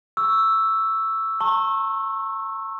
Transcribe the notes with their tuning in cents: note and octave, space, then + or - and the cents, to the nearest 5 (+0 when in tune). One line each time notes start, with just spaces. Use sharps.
C#6 +20 E6 +0
A5 +45 C#6 -30